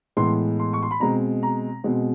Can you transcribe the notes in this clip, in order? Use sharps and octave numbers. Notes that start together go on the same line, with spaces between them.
A2 E3 G#3 B3 C6
C6
C#6
C6
B5
B2 G#3 C4 A#5
A#5
B2 G#3 C4